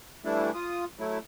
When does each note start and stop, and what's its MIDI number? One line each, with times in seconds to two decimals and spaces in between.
0.25 0.50 52
0.25 0.50 55
0.25 0.50 57
0.25 0.50 62
0.25 0.50 64
0.54 0.85 65
0.54 0.85 87
1.00 1.18 54
1.00 1.18 57
1.00 1.18 64